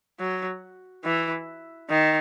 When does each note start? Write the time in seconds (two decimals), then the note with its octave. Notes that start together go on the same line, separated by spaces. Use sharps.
0.20 F#3
1.05 E3
1.90 D#3